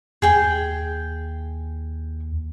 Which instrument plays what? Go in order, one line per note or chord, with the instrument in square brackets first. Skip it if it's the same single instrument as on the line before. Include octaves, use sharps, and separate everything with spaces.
[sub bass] D#2 [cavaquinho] G#4 G5